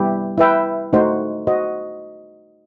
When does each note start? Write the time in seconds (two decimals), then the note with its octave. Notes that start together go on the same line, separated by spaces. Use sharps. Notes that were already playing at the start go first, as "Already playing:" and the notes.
Already playing: G3 B3 E4 G4
0.38 E4 B4 E5 G5
0.93 A3 D#4 F#4 C5
1.47 F#4 C5 D#5